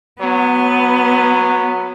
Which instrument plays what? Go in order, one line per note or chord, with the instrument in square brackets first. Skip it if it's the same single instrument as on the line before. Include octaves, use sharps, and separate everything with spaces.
[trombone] F#3 [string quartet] B3